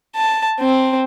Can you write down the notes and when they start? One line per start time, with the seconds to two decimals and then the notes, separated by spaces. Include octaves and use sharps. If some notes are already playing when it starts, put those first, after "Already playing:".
0.16 A5
0.61 C4